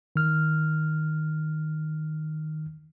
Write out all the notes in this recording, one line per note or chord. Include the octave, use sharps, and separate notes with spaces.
D#3 F6